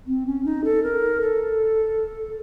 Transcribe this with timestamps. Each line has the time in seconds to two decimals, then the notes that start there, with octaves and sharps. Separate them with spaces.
0.07 C4
0.26 C#4
0.45 D#4
0.64 A4
0.83 A#4
1.21 A4